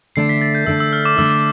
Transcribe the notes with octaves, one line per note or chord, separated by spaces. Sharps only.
D3 A3 D4 C7
B6
A6
G6
D3 A3 D4 E6
E6
F6
D6
D3 A3 D4 E6
D6